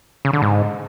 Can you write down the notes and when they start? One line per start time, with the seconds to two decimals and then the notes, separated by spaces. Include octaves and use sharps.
0.25 C#3
0.33 D3
0.42 G#2